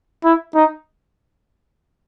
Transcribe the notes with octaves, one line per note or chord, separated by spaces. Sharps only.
E4
D#4